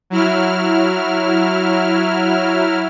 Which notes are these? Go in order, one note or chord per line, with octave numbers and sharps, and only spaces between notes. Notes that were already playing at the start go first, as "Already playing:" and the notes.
F#3 E4 F6